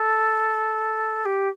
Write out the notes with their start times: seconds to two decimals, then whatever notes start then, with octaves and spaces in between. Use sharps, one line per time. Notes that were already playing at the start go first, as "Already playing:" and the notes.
Already playing: A4
1.25 G4